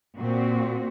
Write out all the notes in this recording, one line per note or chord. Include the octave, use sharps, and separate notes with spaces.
A#2 C4 F#4